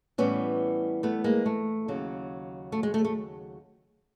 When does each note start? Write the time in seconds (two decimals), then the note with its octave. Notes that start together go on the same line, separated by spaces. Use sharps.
0.18 A2 E3 G3 B3 C#4
1.03 A3 B3
1.24 G#3 A#3
1.46 A3
1.88 D#2 C#3 F#3
2.72 A3
2.83 G#3
2.94 A3
3.05 A3